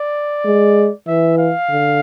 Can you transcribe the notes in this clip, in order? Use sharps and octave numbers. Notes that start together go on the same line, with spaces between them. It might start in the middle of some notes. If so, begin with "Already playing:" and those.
Already playing: D5
G#3
E3 E5
F5
D3